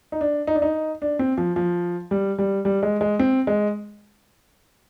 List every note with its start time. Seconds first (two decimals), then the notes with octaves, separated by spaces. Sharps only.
0.12 D#4
0.21 D4
0.47 D#4
0.55 D4
0.62 D#4
1.02 D4
1.19 C4
1.38 F3
1.56 F3
2.11 G3
2.38 G3
2.65 G3
2.83 G#3
3.01 G#3
3.19 C4
3.47 G#3